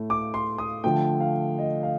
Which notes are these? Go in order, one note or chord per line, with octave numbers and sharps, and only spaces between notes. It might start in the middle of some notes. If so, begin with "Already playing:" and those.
Already playing: A2 A3
D6
C6
D#6
D3 F3 A3 G5
F5
D#5
F5